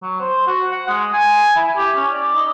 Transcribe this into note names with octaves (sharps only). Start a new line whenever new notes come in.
F#3
C5
F#4
F#5
G#3
G#5
E4
G4
C#4
D5
D#4